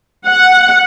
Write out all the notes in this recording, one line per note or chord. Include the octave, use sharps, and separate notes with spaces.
F#5